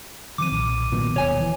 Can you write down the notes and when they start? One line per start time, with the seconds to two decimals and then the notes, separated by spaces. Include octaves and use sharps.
0.38 D#3 F3 C4 D6 D#7
0.52 B1 A#2
0.92 A#2 D#3 F#3 B3
1.16 D#1 B2 C#5 G#5
1.40 E3